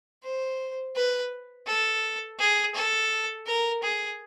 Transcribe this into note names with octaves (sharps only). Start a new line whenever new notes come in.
C5
B4
A4
G#4
A4
A#4
G#4